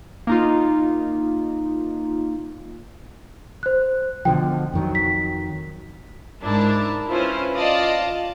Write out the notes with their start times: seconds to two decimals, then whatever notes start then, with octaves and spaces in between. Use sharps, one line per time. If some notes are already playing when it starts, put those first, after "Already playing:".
0.27 A#3 D#4 F4
3.63 C5 F#6
4.25 B2 D3 F3 G5
4.73 F2 D#3 F#3
4.95 B6
6.43 G#2 D4 E4 A#4 A5
7.09 C#4 E4 F4 B4 C5
7.55 F4 D5 D#5 F5 A5